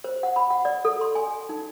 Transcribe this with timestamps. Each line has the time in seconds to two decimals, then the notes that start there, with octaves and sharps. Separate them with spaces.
0.04 C5
0.23 F#5
0.36 B5
0.50 F#5
0.65 D5
0.85 A4
1.01 C6
1.15 G#5
1.49 D#4